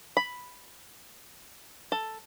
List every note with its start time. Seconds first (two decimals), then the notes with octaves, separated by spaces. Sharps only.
0.17 B5
1.92 A4